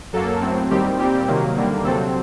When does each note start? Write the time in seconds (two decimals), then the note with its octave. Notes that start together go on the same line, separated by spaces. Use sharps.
0.13 F#2 F#3 A#3 A4
0.41 A2 F#3 C4
0.70 D#2 D#3 G3 C4 G4
0.98 A#2 G3 C4 G4
1.27 C3 D#3 F#3 A#3
1.56 D#2 D3 G3 A#3
1.84 C3 F#3 C4 A4